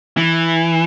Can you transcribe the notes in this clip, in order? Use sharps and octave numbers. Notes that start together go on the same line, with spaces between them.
E3